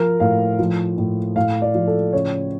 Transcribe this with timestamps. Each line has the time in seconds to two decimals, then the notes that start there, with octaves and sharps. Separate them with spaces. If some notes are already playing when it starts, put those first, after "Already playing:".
Already playing: F3 A#4
0.20 A2 F5
0.59 F3
0.98 A2
1.36 A2 F5
1.62 D5
1.74 F3
1.87 A4
2.13 C#3 C#5